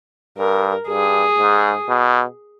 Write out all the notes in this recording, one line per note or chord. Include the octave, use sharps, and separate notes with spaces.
G2 A#4
G2 G#4
G#2
B2